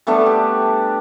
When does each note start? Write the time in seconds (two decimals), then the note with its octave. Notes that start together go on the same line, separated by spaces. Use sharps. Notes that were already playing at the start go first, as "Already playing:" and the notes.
0.07 G3 A3 B3 D4
0.26 G4